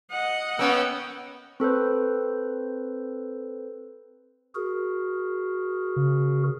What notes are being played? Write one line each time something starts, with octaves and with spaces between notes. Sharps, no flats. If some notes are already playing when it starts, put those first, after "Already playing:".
D#5 F#5
A#3 B3 C#4 G5 E6
C4 A4 B4 C5
F#4 G#4 A#4
C#3